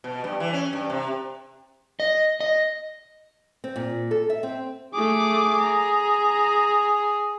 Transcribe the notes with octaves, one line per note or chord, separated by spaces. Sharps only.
B2
G2
E3
C#4
G2
C3
D#5
D#5
C4
A#2
A4
E5
C4
A3 G#4 D6
A#5